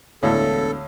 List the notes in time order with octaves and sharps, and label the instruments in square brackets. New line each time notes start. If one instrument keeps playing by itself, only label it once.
[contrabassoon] E1 [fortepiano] D2 A2 [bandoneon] A4 [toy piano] C#5 F5 D#6